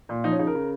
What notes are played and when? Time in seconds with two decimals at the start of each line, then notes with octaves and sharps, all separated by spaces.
0.09 A#2
0.24 F3 D#4
0.32 C#4
0.39 C#3 D#4
0.47 A#4
0.55 C#3